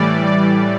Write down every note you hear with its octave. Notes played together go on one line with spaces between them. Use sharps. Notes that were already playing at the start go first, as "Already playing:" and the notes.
Already playing: A2 E3 G3 D5
D5